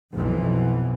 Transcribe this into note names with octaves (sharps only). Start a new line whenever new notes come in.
B1 F2 B2 E3